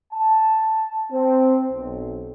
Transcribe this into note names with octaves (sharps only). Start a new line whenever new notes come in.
A5
C4
B1